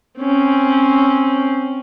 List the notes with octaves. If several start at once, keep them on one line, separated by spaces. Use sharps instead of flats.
C4 C#4